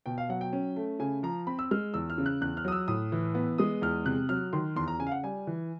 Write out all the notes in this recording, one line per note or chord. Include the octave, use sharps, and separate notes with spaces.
B2 G5
F5
F#3 F#5
G5
C#4
A3
C#3 G#5
F3 A#5
C4 B5
E6
G#3 F6
E2 E6
F6
C#3
F#6
E2 F#6
F6
F#3 D#6
E6
A2 D#6
E3
B3
G#3 D#6
E2 F6
C3 F#6
F#3 F6
D#3 C6
E2 C6
A#5
C#3 G#5
F5
F#5
G3 G#5
E3